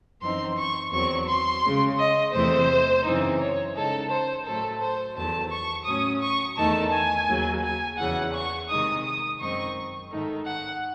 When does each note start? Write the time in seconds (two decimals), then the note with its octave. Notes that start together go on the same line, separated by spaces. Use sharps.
0.21 F#2 E3 C4 D#4 C6
0.57 C#6
0.92 E2 D#3 F#3 C4 C#6
1.28 C6
1.63 C#3 G#3 C#4
1.98 D#5
2.33 E2 C3 E3 A3 C4 C5
3.05 F#2 C#3 E3 C4 D#4
3.39 C#5
3.75 C#3 G#3 D#4 A4
4.10 C5
4.46 A2 F#3 A3 A4
4.80 C5
5.15 E2 D#3 F#3 A3 A5
5.51 C#6
5.86 A2 F#3 C#4 D#6
6.22 C#6
6.57 E2 D#3 A3 D#4 A5
6.93 G#5
7.28 D#2 C#3 F#3
7.64 G#5
7.98 E2 C#3 E3 F#5
8.34 C#6
8.69 C3 D#3 G#3 D#4 D#6
9.05 D#6
9.40 F#2 D#3 G#3 C4 D#4 C#6
10.10 G#2 D#3 A3 D#4
10.45 F#5